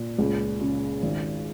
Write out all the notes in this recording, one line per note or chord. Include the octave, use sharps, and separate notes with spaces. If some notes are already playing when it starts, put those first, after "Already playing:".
Already playing: A#2
C#2
C#3
G#1